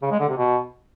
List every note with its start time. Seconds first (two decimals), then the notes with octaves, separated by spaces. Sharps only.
0.02 C#3
0.11 G#3
0.20 D3
0.29 C3
0.37 B2